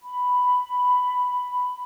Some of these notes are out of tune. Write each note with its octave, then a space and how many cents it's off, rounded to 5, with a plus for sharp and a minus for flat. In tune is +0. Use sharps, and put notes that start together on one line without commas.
B5 +5